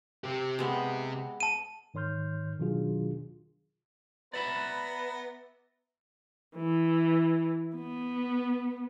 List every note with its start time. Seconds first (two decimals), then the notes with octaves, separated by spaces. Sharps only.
0.24 C3 G4
0.59 G#3 B3
1.40 A5 D#7
1.94 G#2 D#3 C#5 C6 F6 G6
2.59 B2 D#3 F#3 D4 F4 G#4
4.33 B3 B4 D5 E5 A#5 B5
6.56 E3
7.75 B3